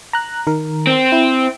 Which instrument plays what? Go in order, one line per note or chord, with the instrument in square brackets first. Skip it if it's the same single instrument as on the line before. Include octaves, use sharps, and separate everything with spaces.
[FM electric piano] A#5 F#6
D#3 A#4
[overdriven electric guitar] C4
[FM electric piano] E4